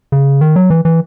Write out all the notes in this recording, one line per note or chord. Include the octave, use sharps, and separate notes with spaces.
C#3
D#3
F#3
E3
E3